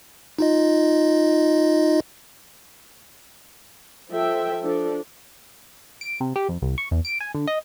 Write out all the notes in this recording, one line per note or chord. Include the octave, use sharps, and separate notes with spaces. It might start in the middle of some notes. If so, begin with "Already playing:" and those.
D#4 F4 D#5
F3 A4 E5 G5
F3 D4 A4
D7
C3
G4
F2
C2
C#6
E2
D7
G#5
D3
D#5